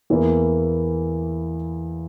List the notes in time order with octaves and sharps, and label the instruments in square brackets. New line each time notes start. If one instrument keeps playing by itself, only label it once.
[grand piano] E2 E3 A#3 E4 A#4